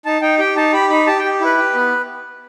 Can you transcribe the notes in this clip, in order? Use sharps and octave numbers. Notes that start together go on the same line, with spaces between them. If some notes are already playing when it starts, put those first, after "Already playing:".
D#4 A5
D#4 G5
G4 G5
D#4 A5
G4 B5
D#4 B5
G4 A5
G5
G4
E4 B4
G4
B3